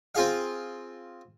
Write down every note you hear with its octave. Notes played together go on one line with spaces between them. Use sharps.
C4 F4 G#4 F5